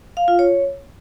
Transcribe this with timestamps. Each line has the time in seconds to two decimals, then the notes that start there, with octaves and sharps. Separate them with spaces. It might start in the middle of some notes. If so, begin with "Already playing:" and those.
0.17 F5
0.28 F4
0.39 C#5